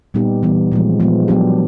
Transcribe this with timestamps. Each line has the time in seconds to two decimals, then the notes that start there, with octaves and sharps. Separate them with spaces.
0.14 A#2 G3 B3 D#4 G4
0.43 E3 G3 B3
0.72 A#2 F3 G#3
1.00 F3 G#3 B3
1.28 F#3 B3 D4 G4